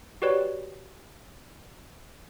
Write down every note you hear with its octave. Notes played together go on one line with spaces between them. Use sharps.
F#4 G4 B4 C#5 D5